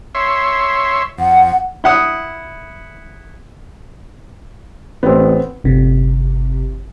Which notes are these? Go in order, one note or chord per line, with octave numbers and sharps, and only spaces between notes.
C#5 E5 C6
F2 F#5
E4 F#5 D#6
A1 B3 C4
G1 C3